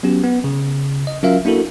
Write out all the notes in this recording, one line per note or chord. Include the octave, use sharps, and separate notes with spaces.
F#3 B3 C#4 G4
B3
C#3
D#5
F#3 C#4 F4 A#4 E5 F5
A#3 D4 E4 F#4 A4 A#4